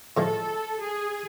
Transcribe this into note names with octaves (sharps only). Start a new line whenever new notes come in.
A2 F3 G#3 A4
G#4